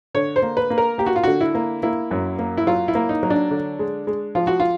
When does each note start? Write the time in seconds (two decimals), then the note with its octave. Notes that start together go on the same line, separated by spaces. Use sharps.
0.14 D3 C#5
0.36 C5
0.42 A#3
0.57 B4
0.70 A#3
0.78 A#4
0.98 A#3 G4
1.06 F#4
1.16 F4
1.23 D3 F#4
1.41 E4
1.55 A#3
1.83 A#3 E4
2.11 F#2
2.39 A#3
2.57 E4
2.67 F#3 F4
2.88 E4
2.95 A#3
3.09 D#4
3.23 F#3
3.30 D4
3.51 D3
3.79 G#3
4.07 G#3
4.35 F3 F4
4.47 F#4
4.60 F4